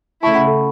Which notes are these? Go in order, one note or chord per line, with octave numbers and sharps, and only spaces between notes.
C#3 A3 E4 A5 C#6
F#5 B5
A4